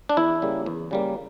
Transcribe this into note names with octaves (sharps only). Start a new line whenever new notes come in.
D4
E2 E4
C#3 G3 A#3
E2
C#3 G3 A#3